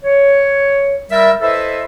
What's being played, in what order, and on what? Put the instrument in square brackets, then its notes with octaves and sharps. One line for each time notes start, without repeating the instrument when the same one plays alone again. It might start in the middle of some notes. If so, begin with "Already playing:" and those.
[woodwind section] C#5
G3 A#4 E5
E4 A4 B4 C5 D#5 E5